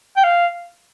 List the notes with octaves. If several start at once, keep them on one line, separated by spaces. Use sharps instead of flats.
G5
F5